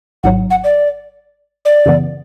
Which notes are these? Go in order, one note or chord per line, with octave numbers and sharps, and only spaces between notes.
G#1 G#2 F#3 F#5
F#5
D5
D5
F#2 C#3 E3 B3